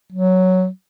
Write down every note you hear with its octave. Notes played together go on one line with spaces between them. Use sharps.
F#3